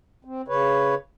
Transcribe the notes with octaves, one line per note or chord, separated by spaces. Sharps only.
C4
C#3 B4 C#5